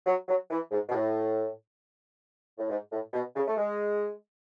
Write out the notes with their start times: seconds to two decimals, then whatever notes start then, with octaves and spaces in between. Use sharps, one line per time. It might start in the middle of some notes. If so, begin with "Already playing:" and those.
0.06 F#3
0.28 F#3
0.50 E3
0.71 G#2
0.89 B2
0.94 A2
2.58 A2
2.70 G#2
2.92 A2
3.13 B2
3.36 C#3
3.47 A3
3.57 G#3